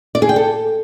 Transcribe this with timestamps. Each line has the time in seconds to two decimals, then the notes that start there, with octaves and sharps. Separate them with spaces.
0.15 D5
0.22 G#4
0.29 G5
0.36 A4